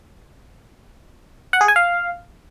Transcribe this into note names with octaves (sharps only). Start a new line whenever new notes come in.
F#5
G#4
G#5
F5